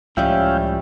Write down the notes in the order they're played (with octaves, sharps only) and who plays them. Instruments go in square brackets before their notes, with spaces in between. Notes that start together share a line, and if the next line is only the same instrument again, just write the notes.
[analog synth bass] C#2 [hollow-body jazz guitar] A2 F3 G3 [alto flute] C#4 [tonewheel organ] E5 F5 G5